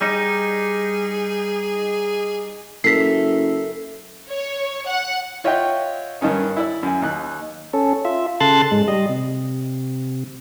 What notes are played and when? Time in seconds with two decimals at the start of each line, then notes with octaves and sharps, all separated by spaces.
0.01 G3 D#4 G#4
2.84 F#1 A4 A#4 E5 B6 C7
4.30 C#5
4.88 F#5
5.44 F4 C#5 D#5 E5 F#5 G5
6.21 G2 D#3 C#4 D#4
6.56 E4 D5 E6
6.83 F#2 G#5
7.02 D#2 D#4 F#6
7.73 C#4 A4
8.05 F4 E5
8.40 C#3 A4 A5 C6 F#6 A6
8.71 G#2 G#3
8.88 G3 D#5
9.09 C3